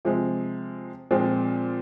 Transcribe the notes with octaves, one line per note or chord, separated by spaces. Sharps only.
C3 F3 G#3
A#2 F3 G#3 C4